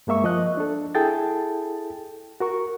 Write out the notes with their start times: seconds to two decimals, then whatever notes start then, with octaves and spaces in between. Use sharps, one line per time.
0.07 G2 G#3 A#3 E5 C#6
0.24 F3 D#5 F#6
0.57 D4 A4
0.95 E4 G#4 A4 G5 A5 A6
2.40 F#4 A#4 C#6